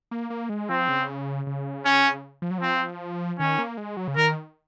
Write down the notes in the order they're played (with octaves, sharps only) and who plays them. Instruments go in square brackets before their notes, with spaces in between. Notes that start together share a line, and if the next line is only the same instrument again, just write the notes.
[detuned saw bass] A#3
A#3
G#3
[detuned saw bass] F3 [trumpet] C4
[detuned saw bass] C#3
C#3
[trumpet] C#4
[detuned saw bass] F3
F#3
[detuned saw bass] F3 [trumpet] C4
[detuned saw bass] D#3 [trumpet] C#4
[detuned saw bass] A#3
G#3
F#3
C#3
[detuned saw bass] D#3 [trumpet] A#4